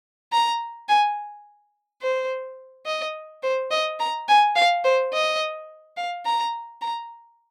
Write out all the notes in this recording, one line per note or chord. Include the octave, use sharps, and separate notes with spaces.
A#5
G#5
C5
D#5
C5
D#5
A#5
G#5
F5
C5
D#5
F5
A#5
A#5